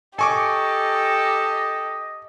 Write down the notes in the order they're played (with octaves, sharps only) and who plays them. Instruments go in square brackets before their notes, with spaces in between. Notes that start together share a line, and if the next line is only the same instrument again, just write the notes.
[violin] G4 [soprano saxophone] A4 [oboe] D#5 [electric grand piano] G#5 C#6 D6